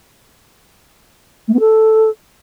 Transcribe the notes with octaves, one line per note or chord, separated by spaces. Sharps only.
A3
B3
A4